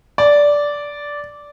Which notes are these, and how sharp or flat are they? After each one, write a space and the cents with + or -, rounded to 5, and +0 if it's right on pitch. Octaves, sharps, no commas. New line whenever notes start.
D5 -10